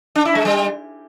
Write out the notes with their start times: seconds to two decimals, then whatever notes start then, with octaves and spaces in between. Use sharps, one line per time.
0.16 D4
0.25 E4
0.35 G#3
0.45 G3